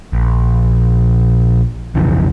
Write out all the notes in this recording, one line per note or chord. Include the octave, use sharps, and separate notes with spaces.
A#1
B1 F2 C#3 E3